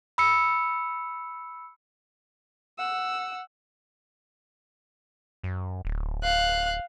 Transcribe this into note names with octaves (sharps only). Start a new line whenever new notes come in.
B5 E6 C#7
F#5 E6
F#2
D1
F5 F#6